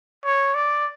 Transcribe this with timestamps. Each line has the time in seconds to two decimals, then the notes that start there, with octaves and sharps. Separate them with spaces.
0.24 C#5
0.54 D5